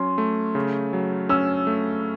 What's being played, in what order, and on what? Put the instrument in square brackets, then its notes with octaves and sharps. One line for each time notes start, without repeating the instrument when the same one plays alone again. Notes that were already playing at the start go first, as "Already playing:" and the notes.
Already playing: [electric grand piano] F#3 C#4 [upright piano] C6
[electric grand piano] A3
C#3
F#3
[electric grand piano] C#4 [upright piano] E6
[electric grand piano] A3